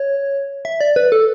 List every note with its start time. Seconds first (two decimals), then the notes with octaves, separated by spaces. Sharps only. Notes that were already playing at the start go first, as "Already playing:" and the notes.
Already playing: C#5
0.65 E5
0.81 D5
0.96 B4
1.12 A4